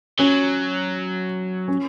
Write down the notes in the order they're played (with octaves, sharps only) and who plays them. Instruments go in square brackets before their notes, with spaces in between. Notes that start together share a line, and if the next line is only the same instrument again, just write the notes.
[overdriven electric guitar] F#3 [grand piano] C#4
[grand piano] C#4